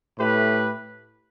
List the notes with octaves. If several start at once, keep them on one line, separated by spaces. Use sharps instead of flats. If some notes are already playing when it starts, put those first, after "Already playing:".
A2 A3 G4 B4